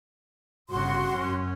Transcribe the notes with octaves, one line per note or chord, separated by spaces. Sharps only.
G1 C#3 F#4 C6
F#2 C#4